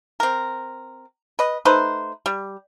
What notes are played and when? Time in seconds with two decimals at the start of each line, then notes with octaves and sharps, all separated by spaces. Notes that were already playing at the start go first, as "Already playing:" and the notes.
0.20 C4 A#4
1.39 B4 D#5
1.65 A3 D#4 B4 C5
2.26 G3